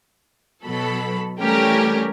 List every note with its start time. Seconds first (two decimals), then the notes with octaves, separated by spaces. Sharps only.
0.65 B2 F#3 A4 B5
1.41 E3 G3 A3 C#4 G4 A#4